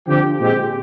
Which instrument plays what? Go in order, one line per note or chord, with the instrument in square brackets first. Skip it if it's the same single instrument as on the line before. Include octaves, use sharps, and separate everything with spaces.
[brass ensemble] D3 F3 C4 G4
A#2 G#3 C4 G4